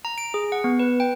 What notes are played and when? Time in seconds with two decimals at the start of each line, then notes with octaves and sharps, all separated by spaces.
0.05 A#5
0.18 D7
0.34 G#4
0.52 F#5
0.64 B3
0.79 B4
1.00 G5